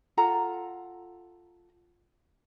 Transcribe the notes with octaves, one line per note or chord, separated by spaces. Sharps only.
F4 A4 F#5 A#5